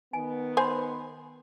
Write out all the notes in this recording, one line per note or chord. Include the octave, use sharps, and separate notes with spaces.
D#3 B3 G#5
C5 G#5 B5 C6